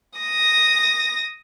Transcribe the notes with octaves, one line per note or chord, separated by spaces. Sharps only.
D#6 A#6